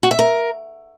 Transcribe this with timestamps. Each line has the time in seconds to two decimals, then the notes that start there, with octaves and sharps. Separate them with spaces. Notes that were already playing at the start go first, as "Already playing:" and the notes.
0.03 F#4
0.11 E5
0.19 A#4